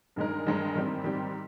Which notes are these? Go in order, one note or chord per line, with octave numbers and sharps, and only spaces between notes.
G2 D#3 G#3 D#4 A#4
G2 D#3 G#3 D#4 A#4
G#2 D#3 G3 C4 G4
G#2 D#3 G3 C4 G4